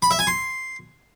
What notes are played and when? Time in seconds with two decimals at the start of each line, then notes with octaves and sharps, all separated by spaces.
0.02 B5
0.11 E5
0.19 G#5
0.27 C6